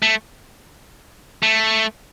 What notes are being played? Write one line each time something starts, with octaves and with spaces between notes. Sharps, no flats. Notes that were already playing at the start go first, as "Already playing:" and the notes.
A3
A3